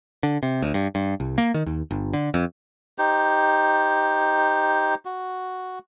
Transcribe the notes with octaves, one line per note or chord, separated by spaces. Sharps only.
D3
C3
D2
G2
G2
C2
A#3
D#3
D#2
G1
D3
F2
D#4 G4 C5
F#4